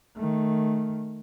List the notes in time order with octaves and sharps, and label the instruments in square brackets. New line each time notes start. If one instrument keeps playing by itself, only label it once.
[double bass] D#3 A3